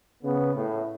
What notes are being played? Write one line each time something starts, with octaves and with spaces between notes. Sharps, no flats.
C#3 B3
A2